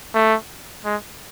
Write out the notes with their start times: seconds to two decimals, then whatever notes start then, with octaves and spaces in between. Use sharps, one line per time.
0.14 A3
0.85 G#3